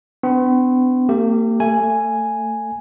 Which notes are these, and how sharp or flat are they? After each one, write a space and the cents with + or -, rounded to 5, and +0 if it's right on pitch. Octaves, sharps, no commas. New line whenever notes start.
B3 +40 D4 +0 C6 +45
A#3 -40 G4 +0
A3 +25 G#5 +0